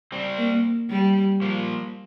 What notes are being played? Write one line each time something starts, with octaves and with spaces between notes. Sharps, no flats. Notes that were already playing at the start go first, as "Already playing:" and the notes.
G3 C4
A#3
G3
F3 A#3